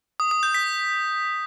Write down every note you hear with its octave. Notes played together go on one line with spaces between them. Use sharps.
D#6
D#6
G6
B6